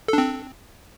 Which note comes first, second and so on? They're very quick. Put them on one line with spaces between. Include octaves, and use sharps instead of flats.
A4 D4 C4